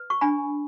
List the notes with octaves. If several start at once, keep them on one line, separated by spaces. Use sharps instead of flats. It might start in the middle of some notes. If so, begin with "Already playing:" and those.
Already playing: B4
C#6
D4 G#5 B5